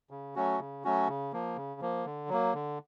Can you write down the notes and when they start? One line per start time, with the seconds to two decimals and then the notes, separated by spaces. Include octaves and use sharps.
0.11 C#3
0.36 F#3 A3 C#4 F#4
0.59 C#3
0.84 F#3 A3 C#4 F#4
1.08 C#3
1.33 F3 A#3
1.56 C#3
1.81 F3 A#3
2.05 D3
2.29 F#3 A#3
2.54 D3